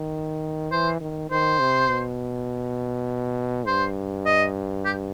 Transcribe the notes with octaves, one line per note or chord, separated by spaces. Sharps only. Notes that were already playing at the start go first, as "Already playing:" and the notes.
Already playing: D#3
E3 C5
D#3
D#3 C5
C3
B2
G2 C5
D#5
G4